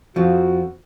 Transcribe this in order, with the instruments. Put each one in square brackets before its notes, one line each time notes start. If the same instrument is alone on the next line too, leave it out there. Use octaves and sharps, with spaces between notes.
[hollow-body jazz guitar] F2 F3 [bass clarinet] F#4